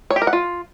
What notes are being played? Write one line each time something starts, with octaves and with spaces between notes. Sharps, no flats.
C#5
G4
A#4
F#5
F4